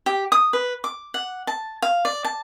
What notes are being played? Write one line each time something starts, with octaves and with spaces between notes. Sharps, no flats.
G4
D#6
B4
D6
F#5
A5
F5
D5
A5